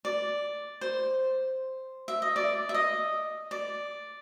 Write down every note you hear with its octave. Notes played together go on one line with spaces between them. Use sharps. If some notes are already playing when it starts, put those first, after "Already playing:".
D5
C5
E5
D#5
D5
E5
D#5
D5